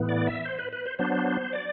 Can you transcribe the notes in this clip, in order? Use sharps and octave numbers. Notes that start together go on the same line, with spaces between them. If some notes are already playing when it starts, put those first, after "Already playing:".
Already playing: A2 E3 B3
D5
E5
C5
B4
B4
C5
F#3 B3 D4 C5
D5